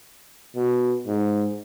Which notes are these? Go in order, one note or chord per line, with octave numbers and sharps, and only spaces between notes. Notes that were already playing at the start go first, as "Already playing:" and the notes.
B2
G#2